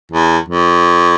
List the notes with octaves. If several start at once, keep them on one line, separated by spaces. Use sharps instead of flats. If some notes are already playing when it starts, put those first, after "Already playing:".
E2
F2